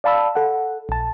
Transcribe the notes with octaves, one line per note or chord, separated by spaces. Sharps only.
D5 F5 A5 B5 E6
A4 F#5
A#1 A5